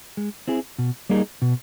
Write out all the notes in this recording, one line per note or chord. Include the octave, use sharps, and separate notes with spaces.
G#3
C4 E4 G#4
B2
G3 A#3 D#4 G#4
B2